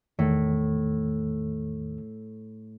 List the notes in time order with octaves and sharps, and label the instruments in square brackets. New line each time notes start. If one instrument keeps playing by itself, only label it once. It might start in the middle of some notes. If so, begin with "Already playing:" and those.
[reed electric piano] E2 D#3 [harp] A2